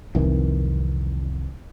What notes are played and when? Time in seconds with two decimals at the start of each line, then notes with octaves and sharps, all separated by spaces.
0.15 C2 F2 D#3 E3